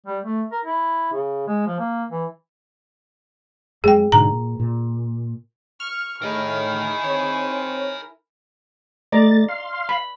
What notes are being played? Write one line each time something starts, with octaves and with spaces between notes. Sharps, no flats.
G3
A3
A#4
E4
C#3
G#3
F3
A#3
E3
F2 F#3 G#3 G#4 G5
G#2 B2 D3 A#5
A#2
A#2
C#6 F6
A2 E4 G#4 A#4 D#5
C4 C#5
A3 D5 D#5 A#5 A6
F5 C6
B5